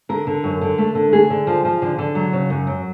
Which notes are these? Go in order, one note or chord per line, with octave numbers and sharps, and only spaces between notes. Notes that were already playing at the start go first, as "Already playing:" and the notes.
D3 A#4
D3
F#2
D3
A3
D3
A3 G#4
D3
F3
F3
D3
D3
F#3
C#3
F#2
F#3